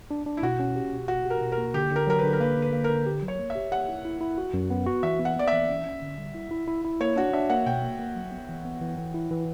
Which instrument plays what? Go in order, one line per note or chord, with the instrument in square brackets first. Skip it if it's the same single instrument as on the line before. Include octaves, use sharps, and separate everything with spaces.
[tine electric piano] D4
D4
[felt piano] E4
[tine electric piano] B2 [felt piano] F#4
[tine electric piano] C#4
G4
B2
[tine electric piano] B2 [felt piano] F#4
[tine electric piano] G4
[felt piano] A#4
[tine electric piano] B2
[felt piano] A#4
[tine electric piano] A#3
[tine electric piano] D3 [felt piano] G4
[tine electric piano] D3 [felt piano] A#4
[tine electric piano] F#3 [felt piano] A#4
[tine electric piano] D3 [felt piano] B4
[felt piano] A#4
[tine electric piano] A#3 [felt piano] B4
[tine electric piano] D3
[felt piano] B4
[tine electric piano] A#3
[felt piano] A#4
[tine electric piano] D3
G4
F#3
[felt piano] C#5
[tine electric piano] A#3
[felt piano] E5
[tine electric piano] G4
[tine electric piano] G4 [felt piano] F#5
[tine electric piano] E4
E4
E4
F#4
F#2
B3
F#4
[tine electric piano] E3 [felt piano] E5
[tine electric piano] B3
[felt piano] F#5
[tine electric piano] B3 [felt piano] D5
[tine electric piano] E3 [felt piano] E5
[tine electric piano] C#4
C#4
D3
G3
E4
E4
E4
E4
[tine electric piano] A#3 [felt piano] C#5
[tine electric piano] D4 [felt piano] F#4
[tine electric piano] D4 [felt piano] E5
[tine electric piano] A#3 [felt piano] F#5
[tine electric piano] B2 [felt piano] G5
[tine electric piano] A#3
A#3
F#3
B3
E3
B3
E3
E3
E4
E3